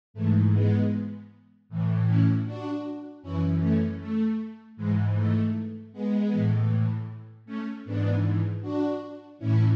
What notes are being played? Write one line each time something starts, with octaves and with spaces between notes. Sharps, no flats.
G#2 E3 A3
G#3 B3
A2 E3
C#4 E4
D4 F#4
F#2 E3 C#4 E4
A3 C#4
A3
G#2 E3 G#3
A3
G#3 B3
A2 E3
A3 C#4
G#2 E3 B3 D4
D4 F#4
A2 E3 C#4 E4